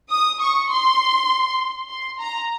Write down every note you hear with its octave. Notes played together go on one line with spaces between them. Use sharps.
D#6
C#6
C6
C6
A#5